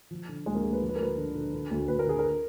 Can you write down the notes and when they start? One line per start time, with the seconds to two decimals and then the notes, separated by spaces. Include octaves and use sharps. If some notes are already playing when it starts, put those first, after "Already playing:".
0.11 F3
0.29 D3
0.46 D2 G#3
0.55 A#3
0.64 D2 G#4
0.73 B4
0.82 F3
0.89 B4
0.96 A#4
0.99 D2 B4
1.17 D3
1.35 D3
1.54 D3
1.71 D2
1.88 D2 B4
1.99 A#4
2.07 D3 G#4
2.19 A#4